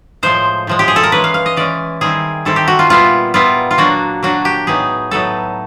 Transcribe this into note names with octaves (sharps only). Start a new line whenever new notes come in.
A2 F3 G#3 C5
A2 F3 G#3
G4
G#4
A4
A#4
E3 G#3 C#4 B4
F5
F5
D#5
E3 G#3 C#4 D5
D#3 G3 C4 E4 G#4
D#3 G3 C4 E4 A4
G4
F#4
F4
A#2 G3 B3 E4 F4
A#2 G3 B3 E4 F4
F4
F#3 A#3 D4 F#4
F#3 A#3 D4 F#4
G4
A2 F#3 B3 D#4 G#4
A2 F#3 B3 D#4 A4